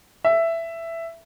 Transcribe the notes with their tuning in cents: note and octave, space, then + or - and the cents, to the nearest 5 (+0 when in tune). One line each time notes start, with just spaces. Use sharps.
E5 +10